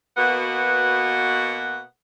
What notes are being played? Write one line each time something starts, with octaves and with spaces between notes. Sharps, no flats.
B2 A#3 B3 F#4 F#5